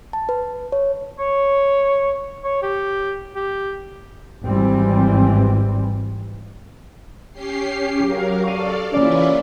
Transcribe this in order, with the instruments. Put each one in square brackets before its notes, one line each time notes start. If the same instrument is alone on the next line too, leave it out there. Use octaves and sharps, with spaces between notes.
[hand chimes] A5
B4
C#5
[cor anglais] C#5
C#5
G4
G4
[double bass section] G#1 E3 G3 C4
[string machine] C#4 G4 C7
[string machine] F#3 A#4 F5 [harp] G4
[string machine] A4 D5 F5 [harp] C#6 D#7
[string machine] E3 E4 F4 [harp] A#3 D5 [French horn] C#4